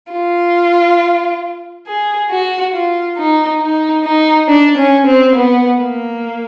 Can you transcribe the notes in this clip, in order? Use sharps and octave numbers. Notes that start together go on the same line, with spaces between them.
F4
G#4
F#4
F4
D#4
D#4
D#4
D4
C#4
C4
B3
A#3